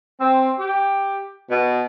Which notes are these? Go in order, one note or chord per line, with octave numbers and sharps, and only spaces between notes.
C4
G4
B2